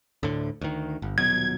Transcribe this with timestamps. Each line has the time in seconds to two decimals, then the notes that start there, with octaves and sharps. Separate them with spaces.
0.23 D2 A2 D3
0.61 D2 D#3
1.02 G1
1.18 D#1 B2 F#3 G#6